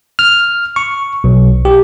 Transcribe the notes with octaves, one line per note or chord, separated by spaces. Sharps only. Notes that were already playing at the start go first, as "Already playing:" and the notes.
F6
C#6
B1
G4